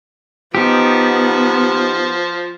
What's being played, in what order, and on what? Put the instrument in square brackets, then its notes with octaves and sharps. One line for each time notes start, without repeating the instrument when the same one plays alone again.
[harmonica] F3 [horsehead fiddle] B3 [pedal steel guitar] D#4 G4